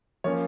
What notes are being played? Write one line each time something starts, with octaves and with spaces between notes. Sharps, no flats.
F3 A#3 C#4 C#5